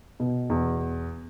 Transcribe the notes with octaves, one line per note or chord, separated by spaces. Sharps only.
B2
E2